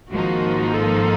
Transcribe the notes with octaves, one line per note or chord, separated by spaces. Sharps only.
G#1 G#2 F3 A#3 D#4 F#4
A4